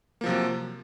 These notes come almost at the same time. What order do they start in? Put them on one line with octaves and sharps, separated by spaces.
A#3 F3 C3 F#3